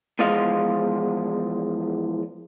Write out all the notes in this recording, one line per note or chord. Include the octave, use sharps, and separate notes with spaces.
E2 F3 G#3 D#5 F5